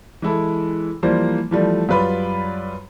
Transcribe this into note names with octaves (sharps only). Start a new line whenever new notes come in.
E3 G#3 E4 A4
E3 F3 G3 A#3 C5
E3 F3 G3 A3
F#2 G3 F4 B4 D5 B5